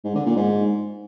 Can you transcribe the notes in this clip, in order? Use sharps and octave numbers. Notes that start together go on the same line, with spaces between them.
G#2
D3
A#2
G#2